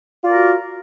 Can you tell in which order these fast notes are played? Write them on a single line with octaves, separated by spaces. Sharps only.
F4 D5 A#4 F#4